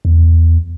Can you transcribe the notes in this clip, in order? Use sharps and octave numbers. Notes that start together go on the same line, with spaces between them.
E2